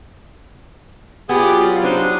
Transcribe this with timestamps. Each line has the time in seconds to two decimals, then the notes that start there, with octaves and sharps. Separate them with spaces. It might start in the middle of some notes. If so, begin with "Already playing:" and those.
1.29 F#3 B3 F4 G4 G#4 D5
1.84 D4 D#4 C5